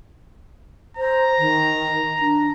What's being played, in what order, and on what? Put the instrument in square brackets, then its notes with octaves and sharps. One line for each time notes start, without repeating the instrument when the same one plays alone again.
[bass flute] C5 [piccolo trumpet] A#5
[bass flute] D#3
D4